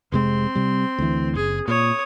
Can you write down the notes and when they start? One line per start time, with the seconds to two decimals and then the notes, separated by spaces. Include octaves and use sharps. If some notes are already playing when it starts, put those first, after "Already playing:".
0.12 F1 C3 G#3 C4 C6
0.55 C3 G3
0.99 D2 E3
1.35 F#1 G#4
1.68 A#2 C#5 D#6